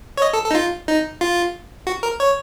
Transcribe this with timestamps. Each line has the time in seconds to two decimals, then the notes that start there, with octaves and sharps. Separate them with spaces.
0.17 C#5
0.22 D#5
0.33 A4
0.44 A4
0.51 D#4
0.55 F4
0.88 D#4
1.21 F4
1.87 F#4
2.03 A#4
2.20 C#5